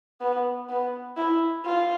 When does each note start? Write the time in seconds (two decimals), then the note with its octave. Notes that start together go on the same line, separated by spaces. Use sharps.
0.21 B3
0.69 B3
1.17 E4
1.65 F4